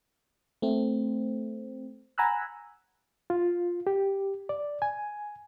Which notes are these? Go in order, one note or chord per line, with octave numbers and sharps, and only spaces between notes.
A3 C4
F#5 G#5 A#5 B5 E6 F#6
F4
G4
D5
G#5